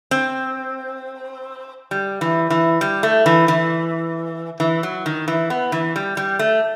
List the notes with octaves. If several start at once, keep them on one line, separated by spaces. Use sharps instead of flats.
C4
G3
E3
E3
G3
A3
E3
E3
E3
F#3
D#3
E3
B3
E3
G3
G3
A3